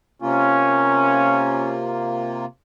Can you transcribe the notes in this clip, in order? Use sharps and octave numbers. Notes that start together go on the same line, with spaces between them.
C3 A#3 C#4 F4